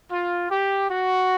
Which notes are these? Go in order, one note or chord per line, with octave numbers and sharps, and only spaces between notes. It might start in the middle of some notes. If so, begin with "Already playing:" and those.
F4
G4
F#4